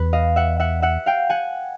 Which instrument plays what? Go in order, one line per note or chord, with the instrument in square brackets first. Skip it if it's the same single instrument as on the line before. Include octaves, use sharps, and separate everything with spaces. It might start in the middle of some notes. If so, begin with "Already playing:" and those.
Already playing: [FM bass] E2 [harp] B4
[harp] D#5 F5
E5 F#5
E5 F#5
E5 F#5
F5 G5
F#5 G#5